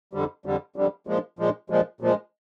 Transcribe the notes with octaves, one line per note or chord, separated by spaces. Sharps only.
F2 D3 G3
F2 D3 G3
F2 D3 G3
A#2 F3 G#3
A#2 F3 G#3
A#2 F3 G#3
A#2 F3 G#3